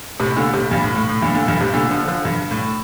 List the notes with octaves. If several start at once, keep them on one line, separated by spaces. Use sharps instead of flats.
A2 C3
A#2 D3
A2 C3
G2 A#2
A2
A2
A2
G2 A#2
A#2 D3
G2 A#2
A2 C3
A#2 D3
D3 F3
D3 F3
G2
A2